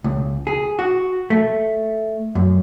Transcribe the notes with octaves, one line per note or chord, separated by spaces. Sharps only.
C#2
G#4
F#4
A3
F#2